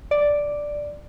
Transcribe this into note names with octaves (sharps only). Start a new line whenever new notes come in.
D5